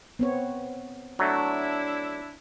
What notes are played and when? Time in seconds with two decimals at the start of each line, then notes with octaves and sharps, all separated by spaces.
0.19 B3 C4 C#5
1.19 F#3 A3 D4 E4